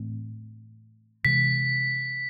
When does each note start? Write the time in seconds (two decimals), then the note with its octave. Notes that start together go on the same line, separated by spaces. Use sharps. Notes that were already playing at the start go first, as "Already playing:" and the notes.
Already playing: A2 E3 A3 C4
1.25 C3 E3 G#3 B6